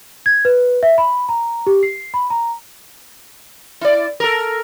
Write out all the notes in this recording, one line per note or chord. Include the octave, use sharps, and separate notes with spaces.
G#6
B4
E5
B5
A#5
G4
C7
B5
A#5
E4 D5
A4 A#4